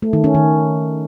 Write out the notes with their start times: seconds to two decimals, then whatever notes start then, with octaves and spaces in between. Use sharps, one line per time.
0.02 A3
0.13 D#3
0.24 C#4
0.35 D#3